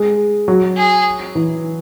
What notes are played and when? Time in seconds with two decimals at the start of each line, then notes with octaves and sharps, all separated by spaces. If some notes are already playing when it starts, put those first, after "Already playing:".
Already playing: G#3
0.48 F#3
0.77 G#4
1.35 E3